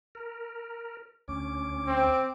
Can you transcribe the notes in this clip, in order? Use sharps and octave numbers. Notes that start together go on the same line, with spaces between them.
A#4
D2 C#4 D6
C4